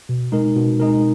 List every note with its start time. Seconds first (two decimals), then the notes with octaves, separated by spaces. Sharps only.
0.09 B2
0.32 G#3 D#4 A#4
0.56 B2
0.80 G#3 D#4 A#4